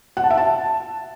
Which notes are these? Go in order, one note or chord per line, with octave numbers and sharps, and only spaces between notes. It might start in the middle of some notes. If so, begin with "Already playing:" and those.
F#5
A5
E5
A5